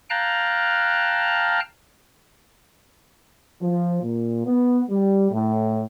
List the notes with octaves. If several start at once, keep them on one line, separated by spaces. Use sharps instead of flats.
F5 G5 A5 A#5 F6 F#6
F3
A#2
B3
G3
A2